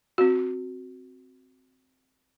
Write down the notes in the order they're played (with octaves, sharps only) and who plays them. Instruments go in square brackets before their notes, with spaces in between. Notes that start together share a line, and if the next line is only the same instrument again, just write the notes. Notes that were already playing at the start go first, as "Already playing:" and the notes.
[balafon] C4 F#4